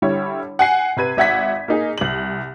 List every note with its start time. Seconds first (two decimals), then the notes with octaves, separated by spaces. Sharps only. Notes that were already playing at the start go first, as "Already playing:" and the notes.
0.02 D3 G3 E4 C#5
0.59 F#5 G#5 C7
0.97 C3 B4 G#6 D#7
1.17 G#1 E5 F#5 G#6 B6
1.68 A#3 D#4 G#4
1.98 C2 F#7